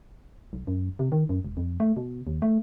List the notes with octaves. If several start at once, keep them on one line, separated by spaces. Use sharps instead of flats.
B1
F#2
C3
D#3
F#2
E1
F2
A3
B2
D#2
A3